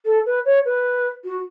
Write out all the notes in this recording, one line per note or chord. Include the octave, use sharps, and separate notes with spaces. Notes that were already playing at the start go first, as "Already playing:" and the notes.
A4
B4
C#5
B4
F#4